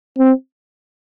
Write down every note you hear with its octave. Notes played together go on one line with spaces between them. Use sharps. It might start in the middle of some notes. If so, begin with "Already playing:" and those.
C4